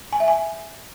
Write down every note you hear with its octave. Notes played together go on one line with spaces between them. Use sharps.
G#5
E5
G#5